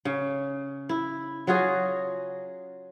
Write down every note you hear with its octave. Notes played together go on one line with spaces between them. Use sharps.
C#3
E4
F#3 F4 F#4 G#4